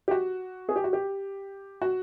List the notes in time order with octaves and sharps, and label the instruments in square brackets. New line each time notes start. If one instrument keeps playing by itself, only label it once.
[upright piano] G4
F#4
G#4
G4
F#4
G4
F#4